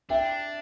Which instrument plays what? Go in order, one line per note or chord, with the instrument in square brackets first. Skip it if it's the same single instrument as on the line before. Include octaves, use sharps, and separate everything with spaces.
[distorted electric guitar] D4 [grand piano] E5 G5